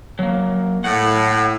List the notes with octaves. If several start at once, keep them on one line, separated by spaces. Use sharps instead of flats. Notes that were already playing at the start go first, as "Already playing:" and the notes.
F#3 A#3
A2 F#5